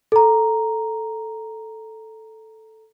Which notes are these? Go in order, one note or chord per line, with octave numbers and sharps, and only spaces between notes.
A4 A#5